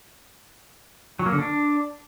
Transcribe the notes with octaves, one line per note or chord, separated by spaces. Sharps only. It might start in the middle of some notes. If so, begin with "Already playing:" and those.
F#3
A#3
D3
D4